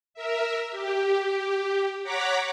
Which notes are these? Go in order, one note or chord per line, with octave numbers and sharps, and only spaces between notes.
A#4 E5
G4
C#5 F#5 A#5 D6 B6